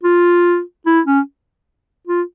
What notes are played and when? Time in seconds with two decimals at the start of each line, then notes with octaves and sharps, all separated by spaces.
0.04 F4
0.86 E4
1.06 C#4
2.08 F4